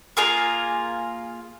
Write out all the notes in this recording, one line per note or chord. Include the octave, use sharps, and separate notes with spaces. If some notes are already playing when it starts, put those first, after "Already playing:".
A#3 F4 G#4 A#4